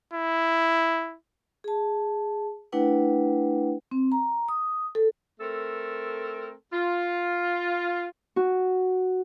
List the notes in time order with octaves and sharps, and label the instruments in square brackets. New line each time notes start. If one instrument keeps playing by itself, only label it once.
[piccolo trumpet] E4
[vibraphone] G#4 A5
A3 D4 E4 B4 F#5 G5
C4
A#5
D#6
A4
[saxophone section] A3 C4 A4 A#4
F4
[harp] F#4